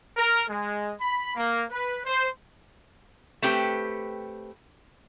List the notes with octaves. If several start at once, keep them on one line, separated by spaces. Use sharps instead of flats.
A#4
G#3
B5
A#3
B4
C5
A3 C4 G4 B4